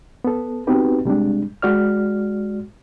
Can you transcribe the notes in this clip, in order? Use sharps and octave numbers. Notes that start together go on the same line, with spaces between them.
B3 A4
B3 C4 D#4 F#4 G4 B4
C3 G3 G#3 D4
G#3 F#4 D5 F6